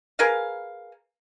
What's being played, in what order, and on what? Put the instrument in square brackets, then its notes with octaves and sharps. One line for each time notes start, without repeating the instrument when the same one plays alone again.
[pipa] G#4 A#4 B4 F5